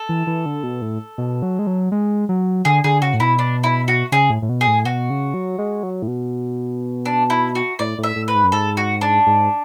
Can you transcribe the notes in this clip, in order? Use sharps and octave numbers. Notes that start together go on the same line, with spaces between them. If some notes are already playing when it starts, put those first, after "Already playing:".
Already playing: A4
E3
E3
D3
B2
A2
B2
F#3
G#3
F#3
G#3
F#3
D3 G#4
D3 G#4
C#3 F#4
A2
B2 E4
D4
E4
F#4
C#3 G#4
A2
A2
B2
G#4
A2
B2 F#4
C#3
F#3
G#3
F#3
A2
B2
D4
E4
F#4
A2 D5
A2
E5
A2
B4
G#2
F#2
G#2 A4
F#4
D4
G#2